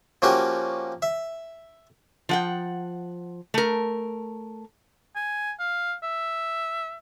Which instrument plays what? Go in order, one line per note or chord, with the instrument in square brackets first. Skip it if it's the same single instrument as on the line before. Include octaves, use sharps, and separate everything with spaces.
[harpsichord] F3 A#3 C#4 F#4 G4 A#4
E5
[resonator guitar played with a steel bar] F3 F#5 G5
A3 A#4
[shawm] G#5
F5
E5